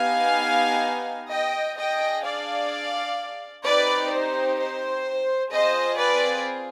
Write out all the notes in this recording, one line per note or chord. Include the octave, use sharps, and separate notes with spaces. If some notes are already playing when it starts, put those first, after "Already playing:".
Already playing: B3 D#4 G4 F5 G#5
D#5 G5
D4 G#4 D#5 G5
D5 F5
C4 D#4 G4 B4 D5
C5
C5
C4 F4 G#4 C5 D#5
B4 D5